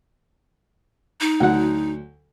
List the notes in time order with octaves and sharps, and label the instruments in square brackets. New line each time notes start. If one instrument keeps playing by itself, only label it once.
[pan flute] D#4
[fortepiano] D2 F#3 F#5